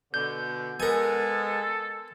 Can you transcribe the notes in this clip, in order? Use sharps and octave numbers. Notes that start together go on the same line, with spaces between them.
B2 D3 G6
G#3 B3 A4 A#4 G#5